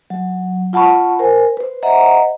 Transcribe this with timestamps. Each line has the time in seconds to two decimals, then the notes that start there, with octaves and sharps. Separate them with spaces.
0.10 F#3
0.73 F4 F#5 A5 B5 C#6
1.19 A#4 C5 G#5
1.57 B4 C5
1.83 C5 D#5 E5 F#5 A#5